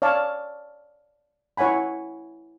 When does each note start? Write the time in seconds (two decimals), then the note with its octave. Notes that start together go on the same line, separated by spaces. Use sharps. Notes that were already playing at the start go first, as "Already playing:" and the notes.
0.02 C#5 D5 F5 A5
1.57 E4 C#5 F#5 G#5 B5